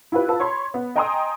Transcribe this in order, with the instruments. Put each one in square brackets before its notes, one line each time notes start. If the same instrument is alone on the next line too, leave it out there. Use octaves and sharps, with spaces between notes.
[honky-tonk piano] E4 F4 G4 B4
F4 B4 A5 E6
C#5 B5 C6
B3
D#5 G5 G#5 A#5 C6 D#6